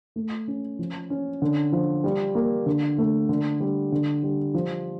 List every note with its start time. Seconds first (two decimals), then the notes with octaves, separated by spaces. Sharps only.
0.16 A3
0.48 C#4
0.79 F3
1.10 C#4
1.42 D3
1.72 F3
2.04 G3
2.35 A#3
2.66 D3
2.98 A3
3.29 D3
3.60 G3
3.92 D3
4.23 G3
4.54 F3